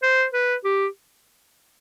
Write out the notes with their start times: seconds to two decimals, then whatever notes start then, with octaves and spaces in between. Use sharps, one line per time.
0.03 C5
0.33 B4
0.64 G4